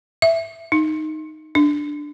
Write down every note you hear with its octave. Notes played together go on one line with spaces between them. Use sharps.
E5
D#4
D4